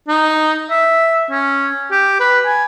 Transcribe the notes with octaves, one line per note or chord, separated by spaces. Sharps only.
D#4
E5
C#4
G4
B4
G#5